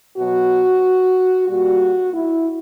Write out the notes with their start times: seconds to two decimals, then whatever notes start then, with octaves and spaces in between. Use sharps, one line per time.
0.17 B2 F#3 F#4
1.48 A#2 G3 F#4
2.13 E4